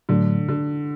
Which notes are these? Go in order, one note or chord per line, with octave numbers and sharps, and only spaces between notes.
A2 D3 F#3 A3 D4
D3